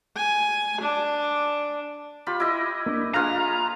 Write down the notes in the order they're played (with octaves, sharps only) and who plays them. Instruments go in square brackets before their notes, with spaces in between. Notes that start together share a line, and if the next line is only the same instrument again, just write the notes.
[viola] G#5
D4
[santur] F4 G4 B5
E4 G4 D#5
[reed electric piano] A#3 D4
[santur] F4 G#4 B4 [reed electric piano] F5 F6 [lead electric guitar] A#5